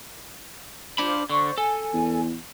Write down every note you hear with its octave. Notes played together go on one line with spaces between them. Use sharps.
D4 F4 C5 B5 D6
D3 C5 D5 C#6
A4 G#5
E2